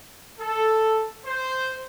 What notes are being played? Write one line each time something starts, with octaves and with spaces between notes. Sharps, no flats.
A4
C5